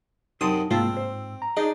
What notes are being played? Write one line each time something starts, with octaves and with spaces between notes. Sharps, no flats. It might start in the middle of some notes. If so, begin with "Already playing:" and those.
F#2 C3 D#4 A5 C6 D#6
C2 G#2 A#3 C4 F4 A5 E6
C5
A#5
D4 D#4 G#4 D#5